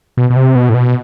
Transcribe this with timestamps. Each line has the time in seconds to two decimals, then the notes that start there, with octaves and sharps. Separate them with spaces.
0.17 B2
0.30 B2
0.36 C3
0.55 B2
0.69 A2
0.74 B2